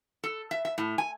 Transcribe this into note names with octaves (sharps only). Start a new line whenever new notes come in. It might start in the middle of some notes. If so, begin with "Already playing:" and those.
A4
E5
E5
A2
G#5